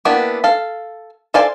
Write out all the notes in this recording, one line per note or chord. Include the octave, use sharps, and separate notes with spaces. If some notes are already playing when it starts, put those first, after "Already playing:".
A#3 B3 D4 E4 G4
A4 F5
A4 C5 D5 F5 G#5